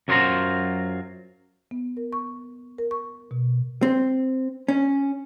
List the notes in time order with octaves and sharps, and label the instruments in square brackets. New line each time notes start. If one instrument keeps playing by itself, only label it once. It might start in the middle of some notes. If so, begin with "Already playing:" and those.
[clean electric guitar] F#2 F#3 B3 F4 C5 A#5
[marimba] B3
A#4
C#6
A#4
C#6
B2
[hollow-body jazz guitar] C4
C#4